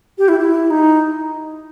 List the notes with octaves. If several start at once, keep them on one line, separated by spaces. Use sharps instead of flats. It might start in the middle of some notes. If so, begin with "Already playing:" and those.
G4
E4
E4
D#4